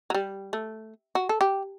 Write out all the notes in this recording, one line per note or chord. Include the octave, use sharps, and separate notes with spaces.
F#3
G3
A3
F#4
A4
G4